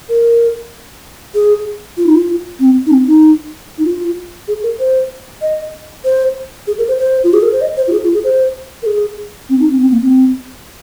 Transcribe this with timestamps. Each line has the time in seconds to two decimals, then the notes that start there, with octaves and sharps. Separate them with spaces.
0.09 A#4
1.35 G#4
1.97 F4
2.06 D#4
2.15 F4
2.60 C4
2.86 D#4
2.91 C4
3.07 D#4
3.78 D#4
3.85 F4
4.48 G#4
4.63 A#4
4.80 C5
5.42 D#5
6.04 C5
6.67 G#4
6.78 A#4
6.88 C5
6.99 C5
7.24 F4
7.33 G#4
7.42 A#4
7.52 C5
7.61 D#5
7.77 C5
7.88 F4
7.92 G#4
8.03 F4
8.14 G#4
8.24 C5
8.83 A#4
8.86 G#4
9.49 C4
9.60 D#4
9.71 C4
9.81 C4
9.91 A#3
10.02 C4